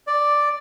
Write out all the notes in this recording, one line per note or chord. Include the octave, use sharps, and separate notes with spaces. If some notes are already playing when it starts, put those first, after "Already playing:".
D5